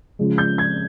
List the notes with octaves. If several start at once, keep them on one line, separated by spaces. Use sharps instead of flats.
C#3 F3 G#3
G6
G#6